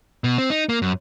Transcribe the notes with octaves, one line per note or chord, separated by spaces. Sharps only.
B2
C4
D#4
A#3
F#2